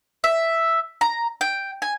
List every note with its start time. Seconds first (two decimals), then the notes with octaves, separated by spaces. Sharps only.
0.24 E5
1.01 A#5
1.41 G5
1.82 G#5